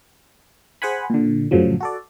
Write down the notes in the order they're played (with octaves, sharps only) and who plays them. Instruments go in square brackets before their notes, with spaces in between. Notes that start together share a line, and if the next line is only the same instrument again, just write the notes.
[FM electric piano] G#4 C5 F#5 G#5 B5
A#2 D3
F#2 A2 C#3 F3 F#3
F#4 A4 D5